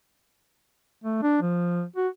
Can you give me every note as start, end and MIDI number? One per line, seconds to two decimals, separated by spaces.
1.04 1.19 57
1.22 1.39 62
1.41 1.83 53
1.96 2.08 66